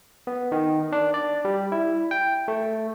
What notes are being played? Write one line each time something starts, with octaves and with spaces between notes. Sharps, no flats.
B3
D#3
D4
D5
G3
E4
G5
A3